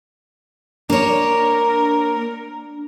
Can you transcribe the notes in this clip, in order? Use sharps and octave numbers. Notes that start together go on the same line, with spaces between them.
A#3 D4 A#4 C#5